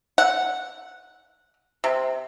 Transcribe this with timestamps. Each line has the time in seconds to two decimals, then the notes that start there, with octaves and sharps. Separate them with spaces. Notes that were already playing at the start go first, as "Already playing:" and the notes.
0.18 F#5
1.84 C3